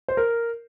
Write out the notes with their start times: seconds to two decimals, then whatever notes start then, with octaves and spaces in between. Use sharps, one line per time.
0.08 C5
0.17 A#4